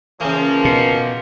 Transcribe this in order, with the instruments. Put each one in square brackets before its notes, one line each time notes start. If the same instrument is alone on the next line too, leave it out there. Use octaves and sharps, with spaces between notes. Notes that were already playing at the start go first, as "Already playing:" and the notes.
[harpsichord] C#3 E3 [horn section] F3 A#3
[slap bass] B2